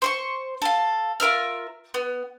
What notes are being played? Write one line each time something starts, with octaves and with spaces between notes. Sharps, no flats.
C5 C6 C#6
A4 F5
F4 A#4 E5 F6
B3